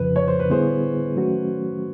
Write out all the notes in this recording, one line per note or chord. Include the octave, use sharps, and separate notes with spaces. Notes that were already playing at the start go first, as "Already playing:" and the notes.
Already playing: F2 C#3 F3 B4
C#5
C5
B4
D3 G3 B3 E4 G#4 C5
D#3 F#3 A3 C#4 F#4